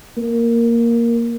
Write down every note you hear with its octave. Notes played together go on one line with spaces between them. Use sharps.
A#3